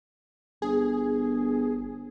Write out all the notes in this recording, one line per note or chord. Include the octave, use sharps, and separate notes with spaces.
G1 G#4